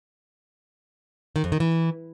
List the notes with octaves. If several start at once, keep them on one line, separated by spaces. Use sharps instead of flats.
D#3
F2
D#3
E3